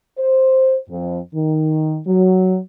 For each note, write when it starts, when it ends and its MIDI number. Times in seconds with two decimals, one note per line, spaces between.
0.18 0.76 72
0.90 1.19 41
1.35 1.99 51
2.07 2.59 54